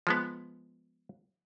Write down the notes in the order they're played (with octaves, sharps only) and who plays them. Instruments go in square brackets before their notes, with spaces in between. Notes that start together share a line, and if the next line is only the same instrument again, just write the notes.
[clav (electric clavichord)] F3 G#3 B3